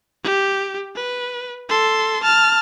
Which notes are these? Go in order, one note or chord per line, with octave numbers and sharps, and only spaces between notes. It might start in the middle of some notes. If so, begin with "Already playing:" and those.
G4
B4
A4 C6
A5 F6